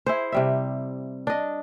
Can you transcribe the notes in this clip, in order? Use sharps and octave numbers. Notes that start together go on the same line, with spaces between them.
E4 G#4 C5
C3 G3 E5
D4 D#5